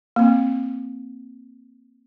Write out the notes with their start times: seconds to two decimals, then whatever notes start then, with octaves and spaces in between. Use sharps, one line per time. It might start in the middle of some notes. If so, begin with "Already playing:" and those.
0.16 A#3 C4